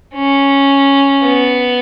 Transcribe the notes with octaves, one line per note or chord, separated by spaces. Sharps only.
C#4
B3